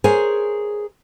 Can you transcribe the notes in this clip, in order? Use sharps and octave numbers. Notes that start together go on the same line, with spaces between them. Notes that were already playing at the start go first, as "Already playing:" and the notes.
G#4 A#4 C5 C#5 G#5